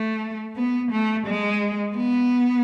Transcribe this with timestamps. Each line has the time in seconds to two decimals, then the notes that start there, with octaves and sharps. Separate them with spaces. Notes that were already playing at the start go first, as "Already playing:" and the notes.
Already playing: A3
0.56 B3
0.91 A3
1.27 G#3
1.97 B3